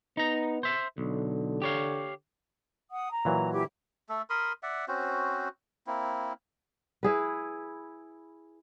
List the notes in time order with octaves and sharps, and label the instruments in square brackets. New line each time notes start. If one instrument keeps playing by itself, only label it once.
[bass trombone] B3 [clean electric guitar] D#4 A#5
[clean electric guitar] C5 E5
[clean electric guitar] B1 [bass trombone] D3
[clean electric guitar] G4 C#5 F5
[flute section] F#5 D#6
A#5
[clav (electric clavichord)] A#2 E3 F#3
[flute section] E4 G4 G#6
[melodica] A3 A4
A#4 B5 C6 D#6
D5 E5 F#5
C4 C#4 F#4 C5
A#3 C4 E4
[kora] E4 G#4 B4